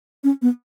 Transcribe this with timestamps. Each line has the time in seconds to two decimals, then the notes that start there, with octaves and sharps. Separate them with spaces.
0.24 C#4
0.42 B3